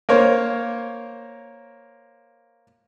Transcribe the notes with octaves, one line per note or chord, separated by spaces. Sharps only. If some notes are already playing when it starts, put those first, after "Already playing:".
A#3 A#4 C5 C#5